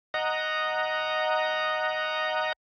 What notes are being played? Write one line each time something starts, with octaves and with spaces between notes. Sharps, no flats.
D#5 F#5 A#5